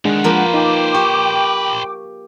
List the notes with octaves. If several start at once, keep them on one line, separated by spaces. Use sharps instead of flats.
D3 D#3 G#3 D4 F#5
F3 A#3 B4 C5
D#4 G5 D6
G4 C#6